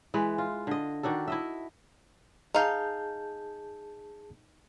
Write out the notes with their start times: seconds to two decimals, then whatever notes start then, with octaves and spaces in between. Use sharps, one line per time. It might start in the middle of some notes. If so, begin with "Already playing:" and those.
0.14 E3 G#3 B4
0.38 F4
0.67 D3 D#5
1.03 D#3 D4 F#4 A4
1.28 E4 D#5 E5
2.55 D#4 G#4 F5 A5 G6